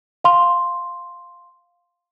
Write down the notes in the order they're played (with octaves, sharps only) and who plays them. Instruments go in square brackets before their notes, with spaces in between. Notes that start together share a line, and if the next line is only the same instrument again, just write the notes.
[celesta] F5 C6